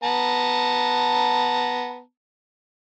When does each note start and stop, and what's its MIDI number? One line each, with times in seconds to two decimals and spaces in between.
0.04 2.00 59
0.04 2.00 81
0.04 2.00 82